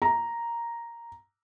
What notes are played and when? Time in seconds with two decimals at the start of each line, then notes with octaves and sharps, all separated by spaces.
0.02 A#5